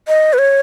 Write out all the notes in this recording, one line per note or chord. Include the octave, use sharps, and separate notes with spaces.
D#5
B4
C#5